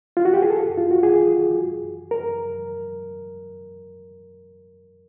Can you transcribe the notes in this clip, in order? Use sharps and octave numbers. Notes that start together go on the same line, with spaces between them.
F4
F#4
G4
G#4
A4
F4
F#4
G#4
A#4